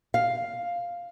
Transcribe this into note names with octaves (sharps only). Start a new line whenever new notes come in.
F5